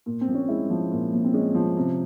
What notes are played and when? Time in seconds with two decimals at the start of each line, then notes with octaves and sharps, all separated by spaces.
0.06 A#2
0.21 C4
0.28 A#1
0.35 C#4
0.49 G#3 E4
0.70 F3
0.92 A#2
1.13 A#1
1.25 C4
1.34 G#3 C#4
1.55 F3
1.77 C3